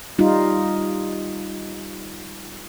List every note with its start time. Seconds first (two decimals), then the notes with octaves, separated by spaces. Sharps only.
0.19 G3 D#4 F4